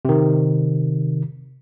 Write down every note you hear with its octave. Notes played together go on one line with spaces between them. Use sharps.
C3 D#3